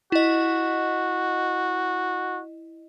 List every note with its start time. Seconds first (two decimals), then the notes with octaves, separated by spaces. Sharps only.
0.12 E4 F#4 D#5